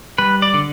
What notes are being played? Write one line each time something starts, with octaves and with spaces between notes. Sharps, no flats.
G3 B4
D5
D3